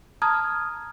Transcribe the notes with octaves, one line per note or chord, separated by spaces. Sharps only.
A5 A#5 D#6 F6 G#6